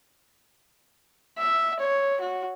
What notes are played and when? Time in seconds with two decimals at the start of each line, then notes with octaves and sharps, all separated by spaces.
1.38 E5
1.80 C#5
2.21 F#4